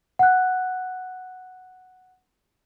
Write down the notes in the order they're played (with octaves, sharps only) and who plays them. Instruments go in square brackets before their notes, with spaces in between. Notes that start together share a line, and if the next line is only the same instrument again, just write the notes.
[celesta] F#5 F#6